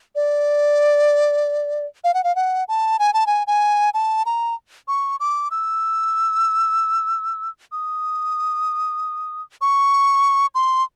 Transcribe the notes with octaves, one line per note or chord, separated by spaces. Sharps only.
D5
F5
F#5
F5
F#5
A5
G#5
A5
G#5
G#5
A5
A#5
C#6
D6
E6
D#6
C#6
C6